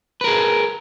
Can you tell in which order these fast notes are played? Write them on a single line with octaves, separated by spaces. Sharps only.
B4 A#4 G#4